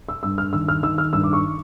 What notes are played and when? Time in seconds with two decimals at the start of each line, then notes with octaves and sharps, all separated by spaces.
0.09 E6
0.23 G2 E6
0.38 F6
0.53 D#3 E6
0.68 F6
0.83 D#3 E6
0.98 F6
1.13 G2 E6
1.23 D6
1.33 C#6